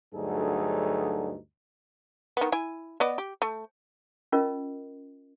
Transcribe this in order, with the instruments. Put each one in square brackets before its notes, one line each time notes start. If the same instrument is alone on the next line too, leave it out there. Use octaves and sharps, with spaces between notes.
[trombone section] D2 G2 F#3 D#4 G#4 A4
[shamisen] D#3 B3
E4 G#5
B3 D5 D#5
G4
A3
[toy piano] C#4 F4 A#4 D#5